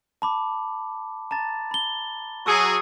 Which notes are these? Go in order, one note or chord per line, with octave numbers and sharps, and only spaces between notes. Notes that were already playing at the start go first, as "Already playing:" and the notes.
A5 B5 D6
A5 A#5 A6
B5 G7
F#3 G#4 C#6 E6 C#7